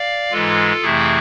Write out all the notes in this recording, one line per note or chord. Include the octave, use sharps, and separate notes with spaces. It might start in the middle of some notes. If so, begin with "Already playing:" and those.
Already playing: D5 F5
G#2 E3 G#3 F4 A4
F2 C3 E3 A3 E4 G#4